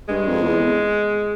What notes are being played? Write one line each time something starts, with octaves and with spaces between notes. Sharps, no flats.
G2 G#3
F2
E2